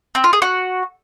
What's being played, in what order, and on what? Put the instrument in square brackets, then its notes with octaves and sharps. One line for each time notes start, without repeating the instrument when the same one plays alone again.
[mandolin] C4
F4
G#4
F#4